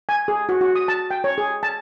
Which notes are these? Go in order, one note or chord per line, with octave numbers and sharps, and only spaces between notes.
G#5
G#4
F#4
F#4
D#6
A5
G5
C#5
G#4
A5